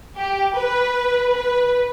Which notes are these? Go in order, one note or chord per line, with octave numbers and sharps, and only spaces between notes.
G4
B4
B4